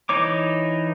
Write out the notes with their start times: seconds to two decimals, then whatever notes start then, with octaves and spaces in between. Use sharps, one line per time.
0.09 E3 D#4 C#5 D6